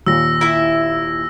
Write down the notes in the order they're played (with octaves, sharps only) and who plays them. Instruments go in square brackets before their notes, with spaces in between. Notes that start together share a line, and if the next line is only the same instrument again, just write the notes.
[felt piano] D#2 A#2 [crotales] E6 A#6
[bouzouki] E4 E5